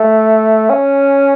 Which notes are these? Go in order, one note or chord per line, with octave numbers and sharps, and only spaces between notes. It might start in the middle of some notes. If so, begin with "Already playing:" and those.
Already playing: A3
C#4